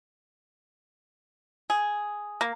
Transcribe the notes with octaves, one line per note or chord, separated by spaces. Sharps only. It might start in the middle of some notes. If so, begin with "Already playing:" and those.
G#4
A#3